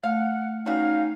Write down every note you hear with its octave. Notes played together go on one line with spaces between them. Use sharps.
A3 F5 F#5
G3 B3 C#4 D#4 F#4 F5